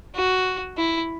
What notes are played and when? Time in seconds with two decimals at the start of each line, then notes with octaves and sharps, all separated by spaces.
0.15 F#4
0.77 E4